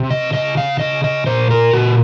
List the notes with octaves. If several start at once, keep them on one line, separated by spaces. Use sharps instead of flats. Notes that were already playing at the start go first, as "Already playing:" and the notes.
Already playing: C3
D#5
C#3 D#5
F5
C#3 D#5
D#5
A#2 C5
A#4
A#2 F#4